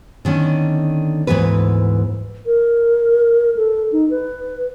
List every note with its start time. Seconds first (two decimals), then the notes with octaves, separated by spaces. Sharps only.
0.25 D3 D#3 B3 C#4
1.27 D2 G#2 C3 E3 B3 B4
2.46 A#4
3.57 A4
3.92 D#4
4.10 B4